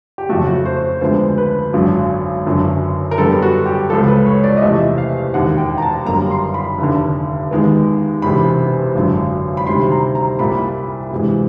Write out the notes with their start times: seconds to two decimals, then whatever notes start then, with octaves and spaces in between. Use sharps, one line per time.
0.18 G4
0.29 F2 C#3 F#3 A3 F#4
0.47 F#4
0.65 C5
1.01 D2 D3 F3 G#3 B3 C5
1.38 B4
1.73 G#1 F#2 D3 F#3
2.46 F#1 F#2 D3 F#3
3.11 A#4
3.18 F#2 D3 G3 B3 A4
3.42 F#4
3.66 G4
3.90 C#2 C#3 F3 A4
4.08 B4
4.26 C#5
4.44 D5
4.57 D#5
4.62 E2 C3 F3 A3 E5
4.98 F5
5.34 E1 D#2 D#3 F#5
5.58 G5
5.78 A#5
5.82 A5
6.06 G1 F#2 D3 G3 A#3 A#5
6.31 C6
6.54 B5
6.78 F1 D#2 D3
7.51 D#2 D#3 G#3 B3
8.22 E1 E2 C3 B5
8.95 G#1 F#2 D3 F#3
9.57 B5
9.67 D2 C3 D#3 G3 C6
9.92 A#5
10.15 A#5
10.39 C2 A#2 G3 A#3 B5
11.11 D2 C3 E3 G#3